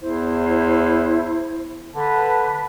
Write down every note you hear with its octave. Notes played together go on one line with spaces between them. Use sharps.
E2 E4 C5
D3 B4 A5